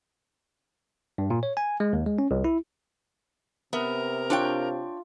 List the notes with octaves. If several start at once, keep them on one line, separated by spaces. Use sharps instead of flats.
G2
A#2
C#5
G#5
G#3
D#2
G#3
C#4
C2
E4
C3 B3 A#4 E5
D4 F4 C#5 G5